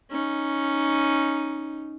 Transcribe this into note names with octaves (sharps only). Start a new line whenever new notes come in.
C#4 D#4